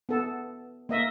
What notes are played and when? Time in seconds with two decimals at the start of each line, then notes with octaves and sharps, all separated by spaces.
0.09 B3 A4
0.89 A#3 D#5 E5